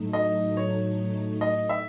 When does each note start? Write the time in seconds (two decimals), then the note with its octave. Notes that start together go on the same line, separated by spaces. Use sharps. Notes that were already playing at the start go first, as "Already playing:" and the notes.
Already playing: A2 F#3 A3 D#4
0.13 D#5
0.57 C#5
1.41 D#5
1.69 E5